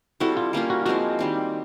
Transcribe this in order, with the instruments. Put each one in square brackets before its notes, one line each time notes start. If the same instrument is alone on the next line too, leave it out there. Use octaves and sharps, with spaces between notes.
[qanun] G3 C4 E4 A4 [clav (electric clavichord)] F#4
[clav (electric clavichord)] F4
[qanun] G3 A#3 C#4 F4
[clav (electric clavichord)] F#4
[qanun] F3 G#3 C4 E4 [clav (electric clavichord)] F#4
[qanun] D#3 G3 C4